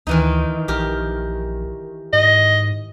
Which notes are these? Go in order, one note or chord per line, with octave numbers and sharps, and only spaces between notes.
D2 D#3 E3 D#4
A#1 G4 A#4
G#2 D#5